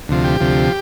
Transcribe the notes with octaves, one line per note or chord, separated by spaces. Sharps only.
D2 C3 F3
G4
D2 C3 F3